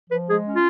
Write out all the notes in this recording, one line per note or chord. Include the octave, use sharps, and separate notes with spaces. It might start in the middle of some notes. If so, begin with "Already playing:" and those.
F3 B4
G#3 G#4
C#4
F4